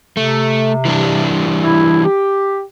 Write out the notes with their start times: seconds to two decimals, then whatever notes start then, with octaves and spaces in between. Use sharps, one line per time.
0.17 C3 A3
0.85 E3 G3 D4
1.63 E4
2.03 G4